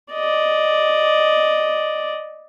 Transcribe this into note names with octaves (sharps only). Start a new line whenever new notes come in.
D5 D#5